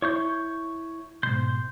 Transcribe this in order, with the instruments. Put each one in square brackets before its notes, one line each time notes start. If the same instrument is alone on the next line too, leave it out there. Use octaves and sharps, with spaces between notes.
[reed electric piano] E4 [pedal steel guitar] C#5 C#6 G6
[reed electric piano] G#2 B2 [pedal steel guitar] C6 G6